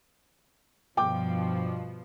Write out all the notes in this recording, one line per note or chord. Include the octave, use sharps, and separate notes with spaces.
G2 B2 F3 G5 D6